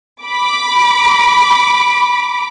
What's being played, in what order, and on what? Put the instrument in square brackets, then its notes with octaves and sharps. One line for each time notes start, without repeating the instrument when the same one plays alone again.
[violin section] B5 D6